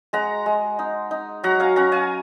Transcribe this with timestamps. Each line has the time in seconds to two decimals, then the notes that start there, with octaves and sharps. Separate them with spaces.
0.13 G#3 F#5 A#5
0.46 G#3
0.79 D#4
1.11 D#4
1.43 F#3 F#5 A#5
1.60 F5 G#5
1.76 C#4 F#5 A#5
1.92 F5 G#5